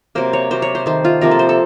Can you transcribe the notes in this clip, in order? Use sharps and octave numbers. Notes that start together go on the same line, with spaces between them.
C3 F#3 A#3 C5
C#5
C3 F#3 A#3 C5
C#5
C5
D#3 A3 C5
F4
C3 F3 A#3 A#4
A4
C5
A4